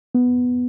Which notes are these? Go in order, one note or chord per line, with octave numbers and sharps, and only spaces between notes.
B3